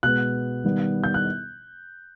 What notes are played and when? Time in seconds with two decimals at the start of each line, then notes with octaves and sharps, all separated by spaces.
0.03 B2 G#3 B3 F#6
0.64 D#3 G3 B3
1.04 G6
1.14 F#6